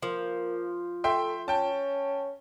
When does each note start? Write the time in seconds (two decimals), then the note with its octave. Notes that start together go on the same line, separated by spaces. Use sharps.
0.03 F3 A#3
1.04 A3 E5 G5 C6
1.48 C#4 G5 A5